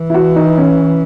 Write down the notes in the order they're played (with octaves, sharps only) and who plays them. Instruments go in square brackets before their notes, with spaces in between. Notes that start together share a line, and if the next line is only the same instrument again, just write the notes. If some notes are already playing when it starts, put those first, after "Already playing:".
Already playing: [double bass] E3
[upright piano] E4
F#4
D#4
C#4